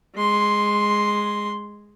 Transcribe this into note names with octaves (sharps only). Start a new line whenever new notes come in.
G#3 C6